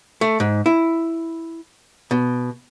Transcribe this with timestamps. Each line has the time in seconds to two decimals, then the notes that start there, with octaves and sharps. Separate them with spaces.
0.21 A3
0.40 G#2
0.66 E4
2.11 B2